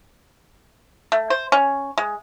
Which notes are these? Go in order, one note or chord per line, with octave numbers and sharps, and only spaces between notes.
A3
C5
C#4
G#3